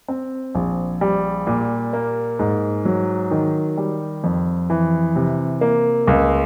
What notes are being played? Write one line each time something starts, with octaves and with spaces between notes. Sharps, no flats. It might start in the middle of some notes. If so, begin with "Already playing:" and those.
C4
A#1
G3
A#2
A#3
G#2
F#3
D#3
G3
F2
E3
C3
A#3
C#2